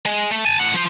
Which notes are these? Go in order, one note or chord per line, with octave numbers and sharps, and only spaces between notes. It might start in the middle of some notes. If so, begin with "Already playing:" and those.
G#3
A3
G#5 A5
A2 F#5
F3 C5